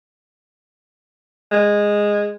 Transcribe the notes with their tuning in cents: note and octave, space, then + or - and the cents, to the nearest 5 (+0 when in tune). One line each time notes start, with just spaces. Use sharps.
G#3 -10